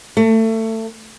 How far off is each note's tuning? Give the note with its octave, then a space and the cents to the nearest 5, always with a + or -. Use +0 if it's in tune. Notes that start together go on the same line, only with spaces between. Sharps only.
A3 +25